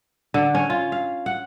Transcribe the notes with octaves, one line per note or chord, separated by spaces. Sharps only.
D3
C#4
F4
F5
F#5